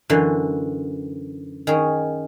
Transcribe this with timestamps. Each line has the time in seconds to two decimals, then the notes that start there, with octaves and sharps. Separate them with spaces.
0.10 F#2 D3 E3 C6
1.67 D#3 C#4 G#4